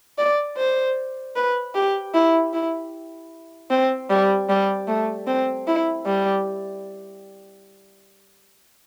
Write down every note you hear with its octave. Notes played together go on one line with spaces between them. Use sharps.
D5
C5
B4
G4
E4
E4
C4
G3
G3
A3
C4
E4
G3